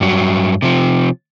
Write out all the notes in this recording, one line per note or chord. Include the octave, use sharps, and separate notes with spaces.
G2 F#3
C3 F3